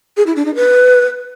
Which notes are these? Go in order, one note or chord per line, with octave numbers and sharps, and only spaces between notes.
G#4
E4
D4
D#4
B4